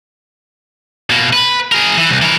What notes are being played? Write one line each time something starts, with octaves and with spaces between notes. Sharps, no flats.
B2 A#3
B4
G#4 A#4
E3
C2
E3 A#4